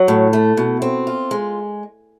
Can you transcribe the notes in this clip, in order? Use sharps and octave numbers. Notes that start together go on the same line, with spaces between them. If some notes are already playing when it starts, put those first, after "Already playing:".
Already playing: F#3
A2
A3
B2
C4
F4
G#3